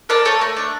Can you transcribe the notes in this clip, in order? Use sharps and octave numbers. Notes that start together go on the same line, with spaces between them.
A4 A#4 D5
A3 A4 C#5
A3 A#4
D4